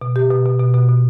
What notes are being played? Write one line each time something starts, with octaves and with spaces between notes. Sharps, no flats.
B2
G4
B2
B2
B2
B2
B2